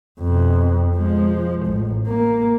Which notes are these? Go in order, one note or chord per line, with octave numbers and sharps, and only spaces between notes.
F2 B2
F3 G#3
A1
A#3